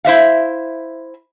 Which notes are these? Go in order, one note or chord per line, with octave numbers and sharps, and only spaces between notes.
E4 C5 E5 F5